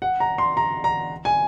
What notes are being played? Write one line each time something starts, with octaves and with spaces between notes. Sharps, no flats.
F#5
A#5
C6
A#5
A#5
G#5